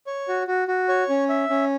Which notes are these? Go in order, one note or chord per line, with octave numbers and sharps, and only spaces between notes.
C#5
F#4
F#4
F#4
C#5
C#4
E5
C#4